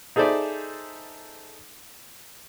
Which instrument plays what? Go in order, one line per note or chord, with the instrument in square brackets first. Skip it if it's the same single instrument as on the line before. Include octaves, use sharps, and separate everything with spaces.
[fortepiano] D#4 G#4 A4 C5 D5 E5